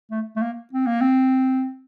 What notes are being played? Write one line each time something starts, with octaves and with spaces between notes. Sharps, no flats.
A3
A3
A#3
C4
A#3
C4